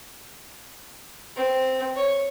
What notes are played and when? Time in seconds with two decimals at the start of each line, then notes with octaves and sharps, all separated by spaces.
1.36 C4
1.96 C#5